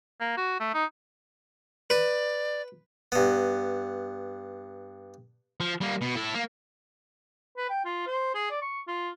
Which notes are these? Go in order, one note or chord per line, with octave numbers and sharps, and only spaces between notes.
A#3
F#4
A3
D#4
B4 D5
G2 B3
F3
G3 A#3
B2
E4 A4
A#3
B4
G5
F4
C5
G#4
D5
C#6
F4